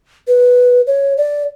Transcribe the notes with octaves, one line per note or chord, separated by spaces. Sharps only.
B4
C#5
D5